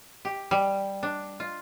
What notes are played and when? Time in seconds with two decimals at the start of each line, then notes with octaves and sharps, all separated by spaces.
0.25 G4
0.51 G3
1.03 D4
1.40 F4